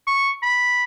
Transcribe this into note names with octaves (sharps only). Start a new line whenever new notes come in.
C#6
B5